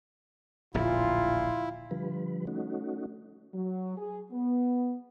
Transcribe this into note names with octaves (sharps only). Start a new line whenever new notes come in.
D1 A#1 F2 A#2 E4 F4
D3 F3 G3 B4
A3 C#4 D#4 F#4
F#3
G#4
B3